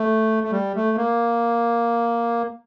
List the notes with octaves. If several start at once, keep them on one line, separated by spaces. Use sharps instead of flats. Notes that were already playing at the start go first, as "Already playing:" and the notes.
Already playing: A3
A3
G3
A3
A#3